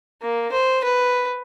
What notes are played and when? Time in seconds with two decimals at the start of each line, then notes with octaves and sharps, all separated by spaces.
0.22 A#3
0.52 C5
0.84 B4